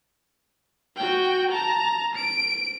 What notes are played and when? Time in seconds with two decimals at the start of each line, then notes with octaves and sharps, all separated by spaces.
0.96 F#4 G5
1.51 A5 A#5
2.16 D7